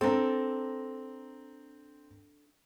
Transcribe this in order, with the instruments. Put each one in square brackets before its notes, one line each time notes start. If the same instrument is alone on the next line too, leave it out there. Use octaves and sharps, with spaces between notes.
[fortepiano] C4 A#5 [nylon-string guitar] D4 A4